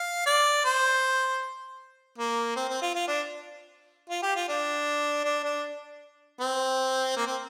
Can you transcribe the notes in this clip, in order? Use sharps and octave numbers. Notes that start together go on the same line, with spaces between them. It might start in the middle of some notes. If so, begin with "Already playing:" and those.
Already playing: F5
D5
C5
A#3
C4
C4
F4
F4
D4
F4
G4
F4
D4
D4
D4
C4
A#3
C4